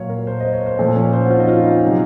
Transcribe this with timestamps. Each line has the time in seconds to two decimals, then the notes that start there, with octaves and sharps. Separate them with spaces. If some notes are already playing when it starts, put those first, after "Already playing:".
Already playing: A#2 F#3 C#5 F5
0.09 A#4
0.27 C5
0.40 D#5
0.53 C#5
0.66 C5
0.79 A#2 F3 A4
0.96 C#4
1.13 C5
1.26 F#4
1.30 F4
1.40 D#4
1.48 F4
1.65 D#4
1.84 C3 F#3